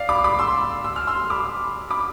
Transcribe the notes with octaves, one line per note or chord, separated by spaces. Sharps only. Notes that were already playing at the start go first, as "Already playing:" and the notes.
Already playing: D5 F5
B5 D6
B5 D6
C6 E6
E6
F6
C6 E6
B5 D6
B5 D6